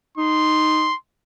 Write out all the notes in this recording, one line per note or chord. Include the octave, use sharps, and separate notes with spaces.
D#4 C6